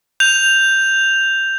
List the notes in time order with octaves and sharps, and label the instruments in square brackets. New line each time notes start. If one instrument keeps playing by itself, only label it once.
[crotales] G6 F7